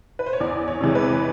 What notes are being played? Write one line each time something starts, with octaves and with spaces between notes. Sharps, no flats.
B4
C5
C#5
E2 D5
C#5
C3 E3 G#3
B4